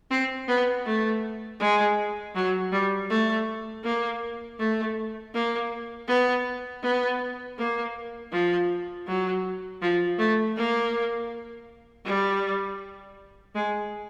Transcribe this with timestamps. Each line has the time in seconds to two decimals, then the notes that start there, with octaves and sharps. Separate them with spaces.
0.11 C4
0.48 B3
0.85 A3
1.60 G#3
2.35 F#3
2.72 G3
3.10 A3
3.84 A#3
4.59 A3
5.34 A#3
6.08 B3
6.83 B3
7.57 A#3
8.32 F3
9.07 F#3
9.82 F3
10.19 A3
10.56 A#3
12.06 G3
13.55 G#3